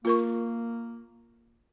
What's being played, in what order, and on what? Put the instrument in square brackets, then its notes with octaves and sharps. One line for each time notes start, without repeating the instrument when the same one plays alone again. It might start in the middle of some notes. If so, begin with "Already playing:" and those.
[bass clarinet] A#3 [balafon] F4 A#4 C#6